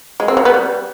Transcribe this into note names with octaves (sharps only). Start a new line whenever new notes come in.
G#3
C4
C#3
B3
G3